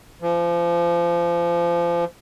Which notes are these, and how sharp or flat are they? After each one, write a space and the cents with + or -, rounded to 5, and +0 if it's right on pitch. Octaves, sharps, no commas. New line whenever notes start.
F3 -30